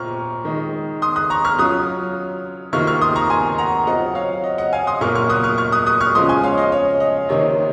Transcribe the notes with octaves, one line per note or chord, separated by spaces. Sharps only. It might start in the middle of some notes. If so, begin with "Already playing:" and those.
Already playing: A#2 C4 F4 A#5 C#6 F6
D#3 G#3 D#4
C6 D#6
D#6 F#6
A#5 C#6
C#6 F6
F#3 C#4 F4 D#6 F#6
C3 D#3 A#3 F4 C#6 F6
C#6 F6
C6 D#6
A#5 C#6
G#5 C6
F#5 A#5
F#3 C4 F4 D#5 F#5
C#5 F5
D#5
D#5 F#5
F5 G#5
C6 D#6
A#2 F#3 A#3 F4 C#6 F6
C#6 F6
D#6 F#6
C#6 F6
C#6 F6
D#6 F#6
D#6 F#6
C#6 F6
C#3 F3 G#3 C6 D#6
G#5 C6
C#5 F5
D#5
C#5
D#5
C3 D#3 A#3 D#4 C#5